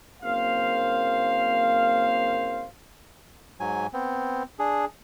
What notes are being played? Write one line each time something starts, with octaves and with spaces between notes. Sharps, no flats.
F#1 A#3 C4 C5 F5
G#2 F#3 G#5
B3 C4
D4 G#4